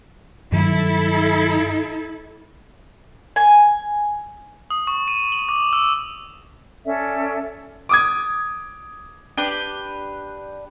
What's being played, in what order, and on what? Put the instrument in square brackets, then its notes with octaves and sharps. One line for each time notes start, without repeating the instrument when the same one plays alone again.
[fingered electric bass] G2 D#3 F#3 [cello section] E4 A4
[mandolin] G#5
[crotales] D#6
C#6
D#7
F#7
D6
E6
[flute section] C#4 A4 D5 E5
[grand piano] D6 D#6 G#6
[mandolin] D4 G4 B4